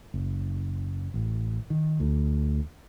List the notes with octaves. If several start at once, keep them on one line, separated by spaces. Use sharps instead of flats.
F#1
A1
D#3
D2